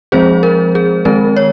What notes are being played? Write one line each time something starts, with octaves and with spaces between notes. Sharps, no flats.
F3 G#3 C4 G#4 C5
A#4
G#4
D#3 G#3 C4 A#4
C#5